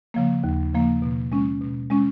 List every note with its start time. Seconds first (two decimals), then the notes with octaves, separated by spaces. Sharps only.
0.14 C#3 F3 A#3
0.44 D#2
0.73 C#3 F3 A#3
1.02 B2
1.32 G#3 C#4
1.61 B2
1.90 G#3 C#4